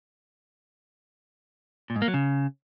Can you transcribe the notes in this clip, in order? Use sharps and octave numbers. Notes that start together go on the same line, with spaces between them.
A#2
G#2
A#3
F#3
C#3